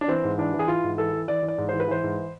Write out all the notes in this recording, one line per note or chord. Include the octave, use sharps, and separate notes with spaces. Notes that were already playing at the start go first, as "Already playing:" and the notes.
D4
E3 C4
G#2
E3 D4
E3
G#4
E3 F4
G#2
E3 A4
E3
E3 D5
E3
D5
G#2
E3 C5
B4
E3 C5
G#2